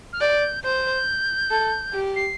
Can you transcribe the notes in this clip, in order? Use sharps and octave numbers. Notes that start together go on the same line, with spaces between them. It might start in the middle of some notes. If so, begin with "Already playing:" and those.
F6
D5 G6
C5 G6
A4
G4
C7